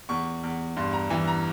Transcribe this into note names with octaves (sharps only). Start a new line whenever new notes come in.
E2 C#6
E2
G2 C6
A#5
E3 G#5
A#5